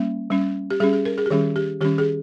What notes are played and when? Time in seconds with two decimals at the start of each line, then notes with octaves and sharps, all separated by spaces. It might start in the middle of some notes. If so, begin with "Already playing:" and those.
Already playing: G3 A#3 C#4
0.30 G3 C#4
0.70 G4
0.80 G3 C#4 G#4
0.93 G#4
1.05 A#4
1.18 G#4
1.26 G4
1.30 D#3 G3 C#4 G#4
1.56 G4
1.81 D#3 G3 C#4 G4
1.98 G#4